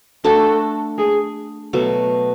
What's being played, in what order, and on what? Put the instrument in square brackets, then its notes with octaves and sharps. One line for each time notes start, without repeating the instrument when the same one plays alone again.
[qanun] A3 D4 F#4 [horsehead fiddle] A4
[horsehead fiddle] G#4
[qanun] B2 F#3 A3